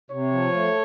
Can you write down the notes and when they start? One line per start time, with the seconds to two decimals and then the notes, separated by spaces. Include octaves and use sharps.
0.11 C3 C#5
0.31 F3
0.52 A3